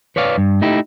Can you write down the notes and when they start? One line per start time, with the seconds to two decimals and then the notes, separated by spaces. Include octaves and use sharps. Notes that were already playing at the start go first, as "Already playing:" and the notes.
0.16 B4 C#5 D5 F5
0.38 G2
0.62 A3 D#4 E4 G4